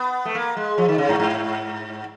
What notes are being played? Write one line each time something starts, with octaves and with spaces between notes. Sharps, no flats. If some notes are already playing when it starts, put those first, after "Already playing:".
Already playing: B3
A3
A#3
G#3
F3
D#3
C#3
G#2
G#2